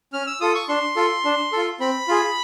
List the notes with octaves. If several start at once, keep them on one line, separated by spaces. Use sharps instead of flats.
C#4 F6
E6
F4 A4 D#6
C#6
D4 C6
F4 A4
D4
F4 A4
C4 B5
F4 G#4